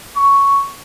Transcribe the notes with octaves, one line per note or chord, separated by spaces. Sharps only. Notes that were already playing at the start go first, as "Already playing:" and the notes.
C#6